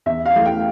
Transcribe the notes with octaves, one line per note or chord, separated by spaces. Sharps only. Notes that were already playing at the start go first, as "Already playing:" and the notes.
E2 E5
F5
E3 A3
G5